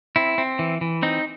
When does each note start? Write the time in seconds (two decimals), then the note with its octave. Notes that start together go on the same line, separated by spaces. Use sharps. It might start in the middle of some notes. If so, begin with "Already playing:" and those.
0.16 C4 E4
0.38 C4
0.59 E3
0.81 E3
1.02 C4 D#4